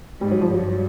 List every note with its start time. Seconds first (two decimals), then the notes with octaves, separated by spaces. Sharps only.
0.21 G#2 G3
0.31 F#3
0.41 F3
0.51 G2 F#3